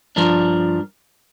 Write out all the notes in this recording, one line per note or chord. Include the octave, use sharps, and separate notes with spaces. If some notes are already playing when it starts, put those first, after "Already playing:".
G2 F3 D4 A#4